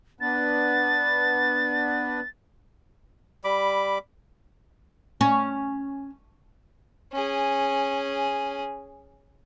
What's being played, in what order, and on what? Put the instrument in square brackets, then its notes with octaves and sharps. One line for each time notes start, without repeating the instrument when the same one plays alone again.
[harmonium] B3 D4 B4 [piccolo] A6
[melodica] G3 B5 D6
[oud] C#4
[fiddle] C#4 G#4